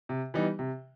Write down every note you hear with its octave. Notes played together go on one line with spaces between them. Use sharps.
C3
E3 G3 B3 D#4
C3